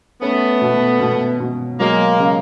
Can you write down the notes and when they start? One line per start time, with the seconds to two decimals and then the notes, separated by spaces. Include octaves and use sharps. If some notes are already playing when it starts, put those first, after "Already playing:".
0.21 A3 B3 C#4
0.61 B2
1.00 B2
1.40 B2
1.80 F#3 G#3 A#3
2.19 C#3